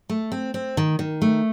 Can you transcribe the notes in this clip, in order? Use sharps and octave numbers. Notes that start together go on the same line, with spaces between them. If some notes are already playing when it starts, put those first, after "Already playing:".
A3
C4
C4
D#3
D#3
A3